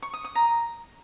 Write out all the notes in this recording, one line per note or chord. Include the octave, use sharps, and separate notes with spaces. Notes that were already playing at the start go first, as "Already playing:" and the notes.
C#6
D#6
D#6
A#5